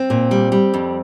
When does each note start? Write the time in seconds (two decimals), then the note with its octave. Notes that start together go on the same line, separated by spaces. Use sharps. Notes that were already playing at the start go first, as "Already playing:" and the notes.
Already playing: C4
0.10 A#2
0.31 G3
0.52 G3
0.74 F2